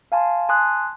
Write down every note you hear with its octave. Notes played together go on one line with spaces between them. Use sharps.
F5 G#5 A5 C6
G#5 A5 C6 D#6 F#6